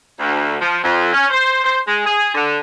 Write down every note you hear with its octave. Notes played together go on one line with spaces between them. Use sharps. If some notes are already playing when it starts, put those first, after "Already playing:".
D2
F3
F2
C#4
C5
C5
G#3
G#4
D3